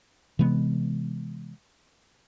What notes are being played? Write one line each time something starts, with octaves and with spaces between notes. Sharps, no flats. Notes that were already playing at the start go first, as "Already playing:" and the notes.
C3 E3 G#3 B3